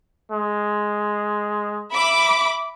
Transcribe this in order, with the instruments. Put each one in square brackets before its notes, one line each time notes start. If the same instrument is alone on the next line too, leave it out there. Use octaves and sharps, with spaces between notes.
[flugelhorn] G#3
[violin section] E5 B5 D6